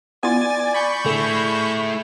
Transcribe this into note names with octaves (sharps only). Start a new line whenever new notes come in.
B3 E4 F4 D5 G#5 A6
B5 C#6 G6
D3 A3 E4 G#4